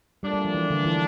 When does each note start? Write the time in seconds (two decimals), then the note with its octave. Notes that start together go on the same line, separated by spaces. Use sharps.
0.23 A#2 G3 A3 D4
0.34 G3
0.45 F3
0.55 E3
0.70 D3
0.85 E3